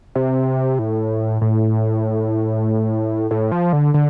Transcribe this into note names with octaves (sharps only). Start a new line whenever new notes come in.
C3
A2
A2
A2
F3
D3
D3